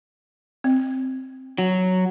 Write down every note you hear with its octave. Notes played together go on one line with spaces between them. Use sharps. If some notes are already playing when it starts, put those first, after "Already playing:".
C4
F#3